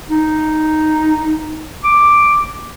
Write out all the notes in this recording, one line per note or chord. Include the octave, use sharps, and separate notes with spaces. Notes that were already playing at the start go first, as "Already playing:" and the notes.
D#4
D6